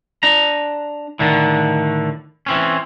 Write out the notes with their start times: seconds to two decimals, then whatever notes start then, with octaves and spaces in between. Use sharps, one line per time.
0.23 D4 A#5
1.19 A2 D3 D#3
2.46 E3 C4 C#4